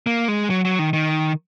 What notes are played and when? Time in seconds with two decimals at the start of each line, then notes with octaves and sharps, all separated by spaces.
0.06 A#3
0.28 G#3
0.50 F#3
0.65 F#3
0.79 D#3
0.93 D#3